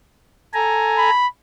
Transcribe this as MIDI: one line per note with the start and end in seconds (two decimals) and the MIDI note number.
0.54 1.10 69
0.54 1.10 80
0.54 1.10 82
0.98 1.27 83